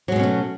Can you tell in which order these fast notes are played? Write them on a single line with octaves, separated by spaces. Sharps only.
F#3 G#3 B2 C#4 A3